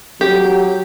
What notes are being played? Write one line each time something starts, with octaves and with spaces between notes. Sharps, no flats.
F#3 G4